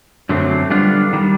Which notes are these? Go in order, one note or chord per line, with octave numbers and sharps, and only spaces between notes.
F#2 D3 F#3 A3 C4
D3 G3 B3 D4 F4
D#3 G3